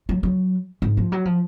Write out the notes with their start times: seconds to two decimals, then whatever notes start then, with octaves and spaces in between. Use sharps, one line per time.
0.09 F#3
0.23 F#3
0.82 G#2
0.97 F3
1.12 F#3
1.25 F3